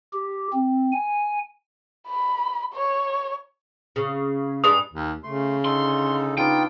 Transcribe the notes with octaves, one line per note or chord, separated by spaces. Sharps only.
G4
C4
G#5
B5
C#5
C#3
G2 G#3 D4 D#6
D#2
C#3 A3 C6
D3 D#4 A4 C6
B3 D4 D#4 F4 G5